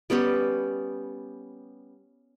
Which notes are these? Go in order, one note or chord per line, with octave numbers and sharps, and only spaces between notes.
G3 B3 C#4 G4